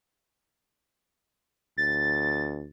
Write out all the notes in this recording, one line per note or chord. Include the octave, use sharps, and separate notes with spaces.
D2 A6